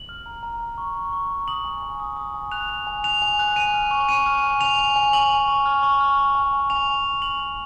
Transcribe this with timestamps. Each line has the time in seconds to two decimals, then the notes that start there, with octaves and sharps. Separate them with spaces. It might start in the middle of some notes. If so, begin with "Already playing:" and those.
Already playing: F#7
0.09 F6
0.26 A#5
0.43 A#5
0.60 A#5
0.78 C#6
0.95 A#5
1.13 C#6
1.30 A#5
1.48 D#6 F#7
1.65 G#5
1.82 G#5
2.00 D#6
2.17 D#6
2.34 G#5
2.52 F#6 F7
2.70 F#6
2.87 G#5
3.04 F#6 F7
3.22 G#5
3.39 F#6
3.56 G#5 D#7
3.74 F6
3.91 C#6
4.08 C#6 D#7
4.26 F6
4.43 G#5
4.61 G#5 F7
4.78 G#5
4.96 G#5
5.13 C#6 F#7
5.30 G#5
5.48 C#6
5.66 F6
5.83 C#6
6.00 F6
6.18 F6
6.35 G#5
6.53 G#5
6.70 G#5 F7
6.88 G#5
7.05 G#5
7.22 F6 F#7
7.39 C#6